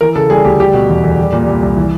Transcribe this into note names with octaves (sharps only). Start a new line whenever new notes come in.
E3 A#4
C#3 A4
G3 G#4
D2 G4
G3 G4
B2
E2
E2
G3
A#2
C2
C2
E3